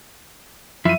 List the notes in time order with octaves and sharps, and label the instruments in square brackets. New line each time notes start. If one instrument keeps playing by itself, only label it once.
[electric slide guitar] F#2 F3 E4 [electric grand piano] E5 D#7